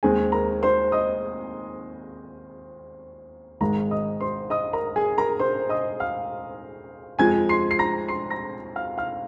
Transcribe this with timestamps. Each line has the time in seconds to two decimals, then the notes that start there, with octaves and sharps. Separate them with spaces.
0.03 D#2 D#3 G#3 C4 G#4 G#5
0.32 A#4 A#5
0.63 C5 C6
0.92 D#5 D#6
3.60 G#1 G#2 D#3 G#3 A#4 A#5
3.91 D#5 D#6
4.21 C5 C6
4.50 D#5 D#6
4.73 A#4 A#5
4.96 G#4 G#5
5.18 A#4 A#5
5.39 C5 C6
5.69 D#5 D#6
6.00 F5 F6
7.19 F2 F3 G#3 C4 G#5 G#6
7.49 C6 C7
7.71 C7
7.79 A#5 A#6
8.08 C6 C7
8.30 A#5 A#6
8.76 F5 F6
8.98 F5 F6